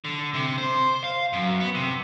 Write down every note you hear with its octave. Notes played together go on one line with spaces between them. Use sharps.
D3
C3
C5
F5
F#2
B3
C3